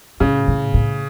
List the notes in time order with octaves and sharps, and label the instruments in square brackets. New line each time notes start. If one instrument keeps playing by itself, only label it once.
[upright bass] A2 [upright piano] C#3
[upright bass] A2
A2